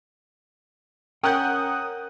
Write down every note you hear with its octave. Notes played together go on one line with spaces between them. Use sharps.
C#4 A#4 F#5 G5 D#6 F#6 G6